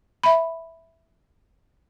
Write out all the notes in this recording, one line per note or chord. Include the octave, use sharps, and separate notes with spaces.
E5 B5